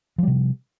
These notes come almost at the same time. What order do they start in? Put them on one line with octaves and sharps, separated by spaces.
F3 G3 C3